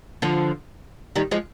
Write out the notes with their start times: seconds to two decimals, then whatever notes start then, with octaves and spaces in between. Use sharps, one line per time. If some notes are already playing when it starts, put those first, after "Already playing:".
0.22 D3 F3
1.15 D#3 G3
1.31 F3 G#3